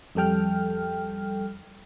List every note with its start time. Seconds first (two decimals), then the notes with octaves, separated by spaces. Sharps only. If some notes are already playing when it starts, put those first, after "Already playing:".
0.15 F2 G3 A4 G5 F6